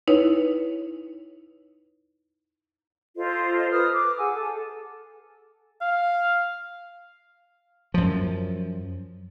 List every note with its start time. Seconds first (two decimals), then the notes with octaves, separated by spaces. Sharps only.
0.08 D#4 E4 B4 C#5
3.17 F4 A4 C5 D#5
3.70 B4 D#6 F6
3.92 D6
4.18 G#4 F#5 G#5 E6
4.34 A4
5.81 F5
7.94 F#2 F3